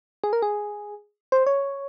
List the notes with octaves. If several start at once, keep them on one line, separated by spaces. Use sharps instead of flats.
G#4
A#4
G#4
C5
C#5